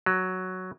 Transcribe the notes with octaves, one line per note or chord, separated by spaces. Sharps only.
F#3